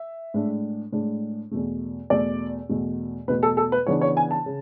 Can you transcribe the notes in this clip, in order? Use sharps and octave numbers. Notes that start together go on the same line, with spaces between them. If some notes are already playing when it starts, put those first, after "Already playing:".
Already playing: E5
A2 G#3 D4
A2 G#3 D4
E2 B2 A3
E2 B2 A3 D5
E2 B2 A3
E2 B2 A3 B4
A4
A4
B4
C#3 E3 B3 D4 C#5
C#5
G#5
A5
C#3